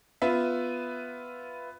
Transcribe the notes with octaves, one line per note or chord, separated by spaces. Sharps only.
B3 F4 B4 E5